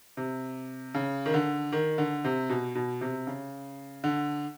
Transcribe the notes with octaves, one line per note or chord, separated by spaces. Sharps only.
C3
C#3
D#3
D3
D#3
D3
C3
B2
B2
C3
C#3
D3